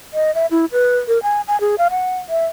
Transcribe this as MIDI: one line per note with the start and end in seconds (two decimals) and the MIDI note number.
0.14 0.33 75
0.35 0.46 76
0.51 0.65 64
0.72 0.98 71
1.08 1.21 70
1.23 1.41 80
1.48 1.59 80
1.61 1.75 68
1.78 1.88 77
1.91 2.19 78
2.29 2.46 76